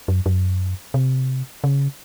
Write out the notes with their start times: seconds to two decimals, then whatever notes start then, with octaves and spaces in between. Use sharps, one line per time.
0.08 F#2
0.26 F#2
0.94 C3
1.64 C#3